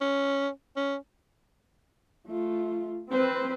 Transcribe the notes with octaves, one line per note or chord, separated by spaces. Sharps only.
C#4
C#4
A3 F4
C4 B4 C5